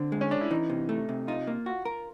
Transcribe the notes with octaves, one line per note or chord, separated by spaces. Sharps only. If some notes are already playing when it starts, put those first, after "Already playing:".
Already playing: D3 C4
G#3
C#4
C#4 D4
E4
E3 D#4
C3
A3
C3
D#4 F4
A#3
F4 F#4
A#4